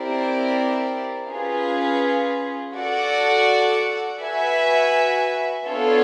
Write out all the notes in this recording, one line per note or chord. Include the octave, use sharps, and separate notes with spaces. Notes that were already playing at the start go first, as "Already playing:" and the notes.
Already playing: C4 E4 G4 A#4 D5
C#4 F4 G#4 B4
F#4 A4 D5 F#5
F#4 B4 E5 G#5
B3 D4 F4 A4 C#5